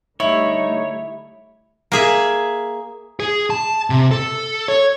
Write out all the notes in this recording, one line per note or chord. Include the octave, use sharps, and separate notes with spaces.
D3 G3 A3 D#4 E4 C#5
A#3 G#4 E5
G#4
A5
C3
A4
C#5